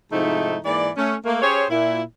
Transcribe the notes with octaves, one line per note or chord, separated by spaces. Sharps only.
G#2 C3 F3 A3 D#4 E4
G#2 E3 A#3 D5
A3 C#4
A3 A#3
C#4 G4 G#4 C5 C#5
A#2 E4